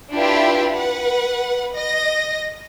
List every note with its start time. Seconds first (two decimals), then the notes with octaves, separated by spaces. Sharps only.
0.13 D4 E4 F4 G4 B4 E5
0.72 B4 F#5
1.73 D#5 A#6